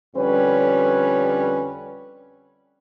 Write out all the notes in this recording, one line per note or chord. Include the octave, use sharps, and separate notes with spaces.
F2 D3 G3 C#4 B4 C#5